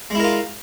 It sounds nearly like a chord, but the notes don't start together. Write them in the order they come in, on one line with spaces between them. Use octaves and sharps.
G#3 E4 A#4 F4